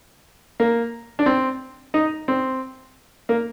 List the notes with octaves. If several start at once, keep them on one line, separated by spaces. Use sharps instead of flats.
A#3
D4
C4
D#4
C4
A#3